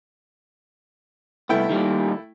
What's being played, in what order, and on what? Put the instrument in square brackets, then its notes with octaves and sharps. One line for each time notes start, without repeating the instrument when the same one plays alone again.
[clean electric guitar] C2 B3 [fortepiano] A3 E4 G5
[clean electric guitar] D#3 G3 A#3